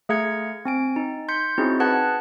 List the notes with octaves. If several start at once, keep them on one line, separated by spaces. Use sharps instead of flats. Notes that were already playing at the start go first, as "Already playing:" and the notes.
A3 G#4 F5 A#5 G#6 C#7
C4 G#5 D7
D#4
C6 G6 B6 C#7
C4 C#4 D#4 E4 F#4 G#4
G#4 B4 F#5 A5 F#6 G#6